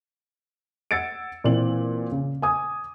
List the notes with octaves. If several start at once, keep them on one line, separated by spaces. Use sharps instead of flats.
F#5 E6 G#6 A6 C#7 D7
A#2 E3 C4 D5 F#7
C#3
G#5 D6 D#6 G#6